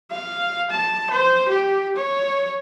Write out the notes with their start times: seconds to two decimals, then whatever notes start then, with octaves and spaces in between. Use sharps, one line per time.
0.11 F5
0.70 A5
1.10 C5
1.48 G4
1.96 C#5